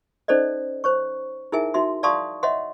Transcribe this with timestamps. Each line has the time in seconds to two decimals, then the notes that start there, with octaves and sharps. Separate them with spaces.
0.28 C#4 D#4 A4 C5 D5 D#5
0.84 C5 C#5 C#6
1.52 D#4 E4 G#4 A#4 E5 G#5
1.74 D#4 F#4 E5 C6
2.03 D5 F5 A5 C6 C#6 D#6
2.43 C#5 D#5 E5 F#5 C6